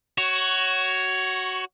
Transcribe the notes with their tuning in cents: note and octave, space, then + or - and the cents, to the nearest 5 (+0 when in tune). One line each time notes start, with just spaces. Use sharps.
F#4 +15 C#5 +0